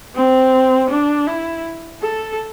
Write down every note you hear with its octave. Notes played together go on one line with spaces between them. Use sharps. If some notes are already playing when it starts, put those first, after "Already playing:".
C4
D4
E4
A4